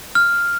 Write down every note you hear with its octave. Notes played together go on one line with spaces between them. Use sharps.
F6